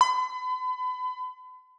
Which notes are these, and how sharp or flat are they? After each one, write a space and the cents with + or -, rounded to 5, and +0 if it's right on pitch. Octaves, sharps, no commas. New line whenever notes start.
B5 +45